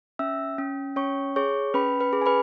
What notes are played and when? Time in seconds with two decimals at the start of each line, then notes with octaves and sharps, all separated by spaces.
0.19 C#4 E5 E6
0.58 C#4
0.96 C#4 C#5 C#6
1.36 G#4 C#5 C#6
1.74 C#4 B4 B5
2.00 B4 B5
2.13 G#4
2.22 G#5
2.26 B4 B5